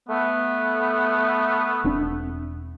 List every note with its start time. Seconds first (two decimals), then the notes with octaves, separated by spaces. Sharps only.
0.09 A3 B3
1.84 E1 C4 D4